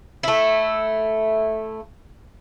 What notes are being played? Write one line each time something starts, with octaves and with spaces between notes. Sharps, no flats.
A3 E4